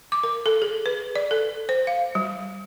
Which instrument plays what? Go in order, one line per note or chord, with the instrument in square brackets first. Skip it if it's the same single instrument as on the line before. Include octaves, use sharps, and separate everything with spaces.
[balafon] D6
A#4
A4
G#4
B4
D5
A4
C5
F5
G3